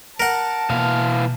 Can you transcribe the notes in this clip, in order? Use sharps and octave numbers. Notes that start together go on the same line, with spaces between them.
A#4 F#5 A5
B2 E3 A#3 B3 F5